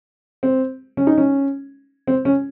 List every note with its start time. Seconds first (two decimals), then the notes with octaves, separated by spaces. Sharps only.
0.43 C4
0.97 C#4
1.07 D#4
1.18 C#4
2.07 C4
2.25 C#4